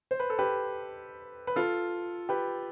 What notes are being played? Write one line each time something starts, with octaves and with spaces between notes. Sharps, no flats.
C5
B4
A4
G4 B4
B4
F4 A4
G4 B4